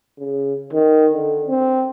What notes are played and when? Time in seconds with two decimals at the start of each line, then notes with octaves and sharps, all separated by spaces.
0.19 C#3
0.73 D#3
1.14 D3
1.47 C4